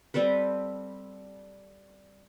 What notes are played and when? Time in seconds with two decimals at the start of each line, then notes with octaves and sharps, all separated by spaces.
0.14 G3 C4 A4 B4